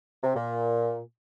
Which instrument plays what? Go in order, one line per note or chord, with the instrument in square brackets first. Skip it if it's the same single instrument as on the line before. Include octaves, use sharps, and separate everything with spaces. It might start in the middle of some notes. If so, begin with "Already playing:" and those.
[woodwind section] C3
A#2